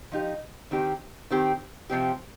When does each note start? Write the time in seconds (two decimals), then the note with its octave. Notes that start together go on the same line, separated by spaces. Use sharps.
0.12 F3 D#4 G4
0.71 D#3 C4 G4
1.31 D#3 C4 G4
1.90 C3 F3 C4 G4